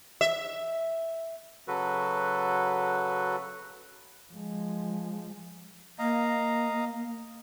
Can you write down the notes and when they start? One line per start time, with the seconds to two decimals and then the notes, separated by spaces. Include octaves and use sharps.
0.21 E5
1.68 C#3 F#3 F#4 A4 B4
4.32 F3 G#3
5.99 A#3 D#5 F5 A#5